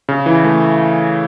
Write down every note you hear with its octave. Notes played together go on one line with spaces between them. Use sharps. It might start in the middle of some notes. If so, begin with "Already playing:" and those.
C#3
E3
A3